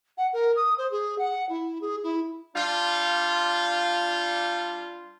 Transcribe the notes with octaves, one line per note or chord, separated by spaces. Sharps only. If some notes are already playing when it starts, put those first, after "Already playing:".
F#5
A#4
D#6
C5
G#4
F#5
E4
G#4
E4
G3 D4 F4